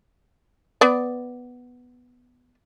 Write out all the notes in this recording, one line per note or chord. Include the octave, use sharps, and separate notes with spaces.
B3 D5